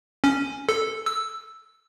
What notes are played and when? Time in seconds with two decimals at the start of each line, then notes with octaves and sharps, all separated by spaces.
0.24 C#4
0.69 A4
1.06 E6